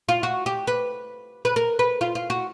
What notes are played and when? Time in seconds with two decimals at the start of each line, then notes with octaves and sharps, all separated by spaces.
0.09 F4
0.23 F#4
0.46 G4
0.67 B4
1.45 B4
1.56 A#4
1.79 B4
2.01 F4
2.15 F4
2.30 F#4